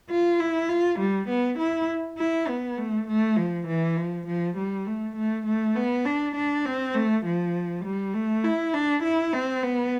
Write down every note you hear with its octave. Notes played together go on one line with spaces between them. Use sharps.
F4
E4
F4
G3
B3
E4
E4
B3
A3
A3
F3
E3
F3
F3
G3
A3
A3
A3
B3
D4
D4
C4
A3
F3
G3
A3
E4
D4
E4
C4
B3